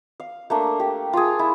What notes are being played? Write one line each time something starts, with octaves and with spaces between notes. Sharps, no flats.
F5
A3 A#3 D4
G4
F4 G#4
E4